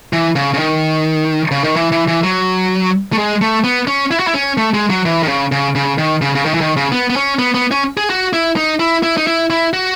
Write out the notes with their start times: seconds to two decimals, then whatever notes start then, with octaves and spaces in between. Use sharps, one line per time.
0.13 E3
0.36 C#3
0.54 C#3
0.59 D#3
1.51 C#3
1.64 D#3
1.76 E3
1.92 E3
2.08 E3
2.24 F#3
3.13 A3
3.18 G#3
3.41 A3
3.64 B3
3.87 C#4
4.11 E4
4.20 F#4
4.27 E4
4.34 C#4
4.57 A3
4.74 G#3
4.90 F#3
5.06 E3
5.23 D#3
5.28 C#3
5.52 C#3
5.75 C#3
5.98 D#3
6.22 C#3
6.35 C#3
6.46 D#3
6.54 E3
6.61 D#3
6.77 C#3
6.92 B3
7.10 B3
7.16 C#4
7.39 B3
7.54 B3
7.71 C#4
7.97 G#4
8.10 F#4
8.33 E4
8.56 D#4
8.80 E4
9.03 E4
9.17 D#4
9.27 E4
9.50 E4
9.73 F#4